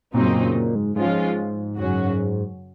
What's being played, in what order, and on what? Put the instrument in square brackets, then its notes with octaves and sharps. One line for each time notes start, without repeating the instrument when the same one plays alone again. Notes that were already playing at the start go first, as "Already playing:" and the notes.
[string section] F#2 C#3 F#3 C4 D#4 [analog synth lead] A#2
[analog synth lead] A#2
A#2
G#2
[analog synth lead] G#2 [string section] F3 G#3 C#4 F4
[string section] F#2 C#3 F#3 C#4 F#4